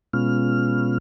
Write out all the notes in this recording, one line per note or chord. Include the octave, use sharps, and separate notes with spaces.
B2 G#3 B3 C#4 F4 F6